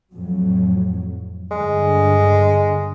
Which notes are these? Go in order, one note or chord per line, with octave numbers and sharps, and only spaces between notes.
F2 A2 F#3
G2 D3 G#3